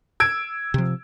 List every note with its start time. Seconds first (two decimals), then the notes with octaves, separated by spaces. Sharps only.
0.20 E6 G#6 D7
0.74 C3 F3